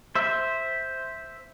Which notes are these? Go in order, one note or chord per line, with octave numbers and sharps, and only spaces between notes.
C5 E5